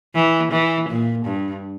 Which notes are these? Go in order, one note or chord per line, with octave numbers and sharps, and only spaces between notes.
E3
E3
A#2
G2